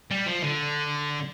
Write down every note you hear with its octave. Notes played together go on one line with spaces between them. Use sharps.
G3
F3
D3